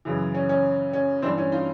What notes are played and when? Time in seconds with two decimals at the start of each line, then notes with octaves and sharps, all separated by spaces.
0.05 F#2 C#3 E3
0.34 C#4
0.49 C#4
0.93 C#4
1.22 G2 E3 C4 D4
1.38 C#4 D#4
1.52 D#4 F4